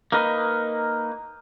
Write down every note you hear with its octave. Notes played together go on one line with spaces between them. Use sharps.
A#3 D#4 B4 D#5